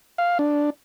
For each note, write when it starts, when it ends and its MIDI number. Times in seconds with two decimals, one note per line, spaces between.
0.18 0.38 77
0.39 0.70 62